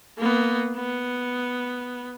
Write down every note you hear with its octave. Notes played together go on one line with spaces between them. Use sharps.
A#3 B3
B3